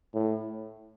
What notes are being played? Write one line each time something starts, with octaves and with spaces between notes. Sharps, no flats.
A2